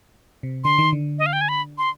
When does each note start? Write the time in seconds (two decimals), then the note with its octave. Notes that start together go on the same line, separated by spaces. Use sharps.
0.43 C3
0.64 D3 C6
0.78 D#3
0.93 D3
1.19 D#5
1.26 F5
1.33 G5
1.41 G#5
1.49 B5
1.78 C6